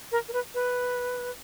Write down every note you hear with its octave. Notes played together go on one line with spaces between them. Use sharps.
A#4
A#4
B4
B4